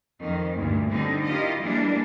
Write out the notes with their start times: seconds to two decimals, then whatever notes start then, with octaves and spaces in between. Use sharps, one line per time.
0.18 F2 D#3
0.55 D2 G2 A#2
0.89 D3 G3 C4 D#4
1.24 E4 F4 G4 A#4 D#5
1.59 E3 G3 G#3 A#3 D4